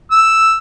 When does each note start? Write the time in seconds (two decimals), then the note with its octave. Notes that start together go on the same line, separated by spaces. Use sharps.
0.11 E6